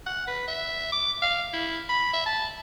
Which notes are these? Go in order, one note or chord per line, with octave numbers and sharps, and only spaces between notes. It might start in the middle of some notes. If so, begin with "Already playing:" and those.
F#5
B4
E5
D6
F5
E4
B5
E5
A5